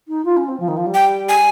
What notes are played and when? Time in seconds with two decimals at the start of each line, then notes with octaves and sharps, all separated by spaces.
0.08 D#4
0.25 F4
0.37 C#4
0.48 C4
0.60 F3
0.68 D#3
0.77 F3
0.86 G3
0.94 G5
1.29 G#5